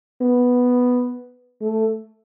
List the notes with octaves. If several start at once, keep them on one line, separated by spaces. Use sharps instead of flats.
B3
A3